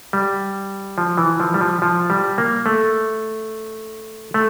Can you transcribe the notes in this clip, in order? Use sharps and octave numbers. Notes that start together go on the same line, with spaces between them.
G3
F3
E3
F3
G3
F3
F3
G3
A#3
A3
A3